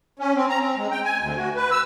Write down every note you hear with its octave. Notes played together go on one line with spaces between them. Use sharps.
C#4
C4
A#5
C4
G#3
G5
G#5
D2
F#4
B4
E6